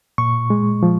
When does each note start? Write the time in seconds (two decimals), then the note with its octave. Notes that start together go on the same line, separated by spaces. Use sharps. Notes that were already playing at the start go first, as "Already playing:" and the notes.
0.18 A#2 C#6
0.50 G#3
0.83 F3